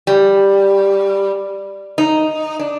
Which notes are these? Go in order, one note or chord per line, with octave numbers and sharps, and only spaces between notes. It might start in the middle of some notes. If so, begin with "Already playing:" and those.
G3
D#4
D4